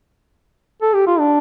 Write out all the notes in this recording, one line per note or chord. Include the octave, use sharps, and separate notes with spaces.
A4
G4
F4
D4